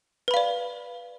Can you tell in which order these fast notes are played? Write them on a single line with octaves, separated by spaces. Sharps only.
B4 B5 F5 D5